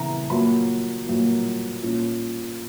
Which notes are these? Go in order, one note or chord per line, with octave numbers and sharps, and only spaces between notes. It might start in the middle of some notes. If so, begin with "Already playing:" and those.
Already playing: C#3 E3 B3 A#5
A#2 F#3 A#3 B5
A#2 F#3 A#3
A#2 A#3 C#4